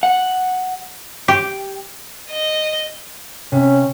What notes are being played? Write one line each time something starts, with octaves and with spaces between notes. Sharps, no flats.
F#5
G4
D#5
C3 C#4